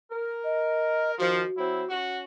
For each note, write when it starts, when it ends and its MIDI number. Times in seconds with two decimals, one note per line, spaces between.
0.11 1.14 70
0.44 1.11 75
1.18 1.41 51
1.18 1.41 53
1.18 1.89 66
1.56 1.83 54
1.56 1.83 60
1.56 1.83 64
1.89 2.24 61
1.89 2.24 66